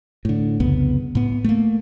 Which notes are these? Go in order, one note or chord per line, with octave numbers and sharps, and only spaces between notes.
A2 D3
C2 F2 C#3 B3
A2 B3
A3 A#3